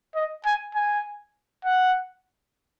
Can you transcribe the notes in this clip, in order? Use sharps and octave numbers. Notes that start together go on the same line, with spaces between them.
D#5
G#5
G#5
F#5